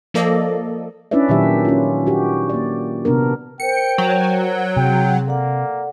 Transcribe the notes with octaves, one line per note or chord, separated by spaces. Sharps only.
F3 A#3 A4 D5 D#5
C#4 D4 E4 B4 D5 E5
A#2 D#3 F#3 D#4 G4 E5
C#4 F4
F#4 G4
A#3 D5
C3 B3 D4 A#4
A#4 C5 G5 C#7
F#3
C3 G#4 G5
A#3 A4 D5 F#5